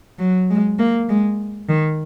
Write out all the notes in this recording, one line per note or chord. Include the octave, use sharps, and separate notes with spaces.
F#3
G#3
A#3
G#3
D#3